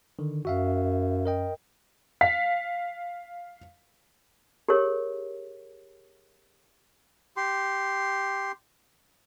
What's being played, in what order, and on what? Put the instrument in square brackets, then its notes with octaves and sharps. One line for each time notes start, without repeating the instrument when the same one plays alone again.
[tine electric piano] D3 D#3
[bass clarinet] F#2 [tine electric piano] F#4 E5 F5
[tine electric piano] A#4 D#5 G5
[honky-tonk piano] F5 B6
[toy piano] G4 G#4 A#4 C#5
[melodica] G4 C6